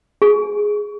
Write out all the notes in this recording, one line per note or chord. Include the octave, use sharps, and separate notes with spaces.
G#4